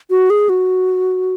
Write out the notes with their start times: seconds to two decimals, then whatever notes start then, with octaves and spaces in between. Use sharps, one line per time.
0.10 F#4
0.30 G#4
0.49 F#4